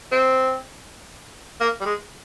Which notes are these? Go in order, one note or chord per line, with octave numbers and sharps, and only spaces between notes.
C4
A#3
G3
G#3